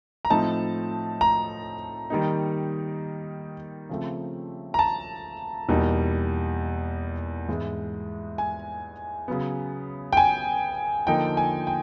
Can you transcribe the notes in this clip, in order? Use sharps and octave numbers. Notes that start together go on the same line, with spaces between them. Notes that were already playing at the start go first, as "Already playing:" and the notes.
A#5
A2 F3 A3 C4 D#4 A5
A#5
D#3 G3 A#3 D#4
C#3 F3 A3 C4
A#5
A5
E2 B2 G3 A#3 D#4
G#2 E3 G#3 B3 E4
G#5
C#3 F#3 B3
G5
G#5
D3 F3 A#3 D#4 G5
G#5
G5